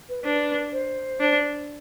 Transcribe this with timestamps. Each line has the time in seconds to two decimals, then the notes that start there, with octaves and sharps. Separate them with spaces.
0.09 B4
0.24 D4 B4 C5
0.73 C5
1.20 D4